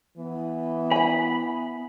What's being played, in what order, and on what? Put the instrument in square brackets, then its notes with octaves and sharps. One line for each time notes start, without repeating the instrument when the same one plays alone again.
[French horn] E3 [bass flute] B3
[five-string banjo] G#5 A#5 [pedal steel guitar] B5